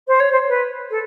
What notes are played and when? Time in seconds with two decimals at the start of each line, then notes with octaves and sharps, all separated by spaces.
0.07 C5
0.20 C#5
0.32 C5
0.48 B4
0.90 A4